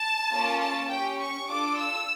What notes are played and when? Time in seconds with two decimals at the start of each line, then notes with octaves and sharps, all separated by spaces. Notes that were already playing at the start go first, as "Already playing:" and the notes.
Already playing: A5
0.32 A#3 C#4 F4 A4
0.60 A5
0.90 C#4 G4 G5
1.20 C#6
1.48 D4 F4 A4 D6
1.78 E6